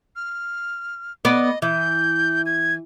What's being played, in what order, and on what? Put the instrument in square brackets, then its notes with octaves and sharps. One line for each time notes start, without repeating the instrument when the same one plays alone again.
[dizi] F6
[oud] B3 D5 [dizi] D#5
[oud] E3 [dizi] G6
[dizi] G#6